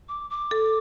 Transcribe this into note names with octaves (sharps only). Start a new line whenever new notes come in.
D6
D6
A4